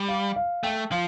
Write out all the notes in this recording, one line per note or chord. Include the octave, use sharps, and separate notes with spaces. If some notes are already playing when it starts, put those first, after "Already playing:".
Already playing: G3
F5
F5
A3 G5
F3 F5